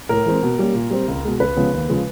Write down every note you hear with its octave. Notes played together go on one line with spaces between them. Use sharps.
A2 A#4
E3 G#3 C4
B2
G3 A#3 C#4
A#2
G3 C4
C#2
B2 G#3
C#2 B4
C#3 F3 G#3 B3
D#2
C#3 F3 G#3